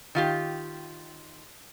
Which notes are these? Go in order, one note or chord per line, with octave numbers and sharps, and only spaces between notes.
D#3 F4 G4